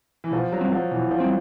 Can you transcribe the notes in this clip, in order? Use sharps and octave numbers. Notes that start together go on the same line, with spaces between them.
E3
B2 F3
F#3
G3 C4
F3
B2 E3
F3
G3 C4